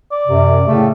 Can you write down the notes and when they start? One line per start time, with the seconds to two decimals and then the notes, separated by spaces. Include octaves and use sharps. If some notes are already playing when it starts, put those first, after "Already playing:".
0.12 D5
0.28 F#2 C3
0.67 A2 C#3 A3